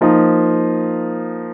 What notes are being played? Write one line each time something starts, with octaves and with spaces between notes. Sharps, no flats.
F3 A#3 D#4